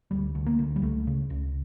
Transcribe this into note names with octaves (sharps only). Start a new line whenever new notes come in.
D2 G3
D2
A#3
D2
G3
C#2 A3
C#3
C#2